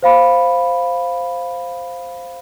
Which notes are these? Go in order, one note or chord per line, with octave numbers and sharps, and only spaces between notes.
C5 F5 B5